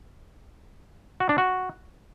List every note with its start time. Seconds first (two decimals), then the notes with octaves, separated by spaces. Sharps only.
1.20 F#4
1.29 D4
1.38 F#4